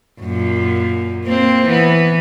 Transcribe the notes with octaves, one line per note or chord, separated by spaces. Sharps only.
F#2 A#2
A#3 C4
E3 B3